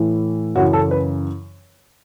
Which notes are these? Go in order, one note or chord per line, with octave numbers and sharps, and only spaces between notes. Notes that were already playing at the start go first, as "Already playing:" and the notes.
Already playing: A2 E3
F#2 C#3 E3 F#4
A4
B4